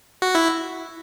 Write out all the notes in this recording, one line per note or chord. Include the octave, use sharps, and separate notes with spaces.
F#4
E4